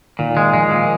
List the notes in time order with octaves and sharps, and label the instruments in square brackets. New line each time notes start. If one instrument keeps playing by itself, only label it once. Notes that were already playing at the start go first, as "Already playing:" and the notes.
[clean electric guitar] A#2 [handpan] D#3
[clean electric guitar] G#3
[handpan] F3 [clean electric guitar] G#3
[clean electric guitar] A#2